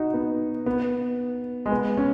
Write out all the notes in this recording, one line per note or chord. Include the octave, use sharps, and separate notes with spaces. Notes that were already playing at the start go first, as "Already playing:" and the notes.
Already playing: D#4 F#4
B3
B3
G#3
B3
C#4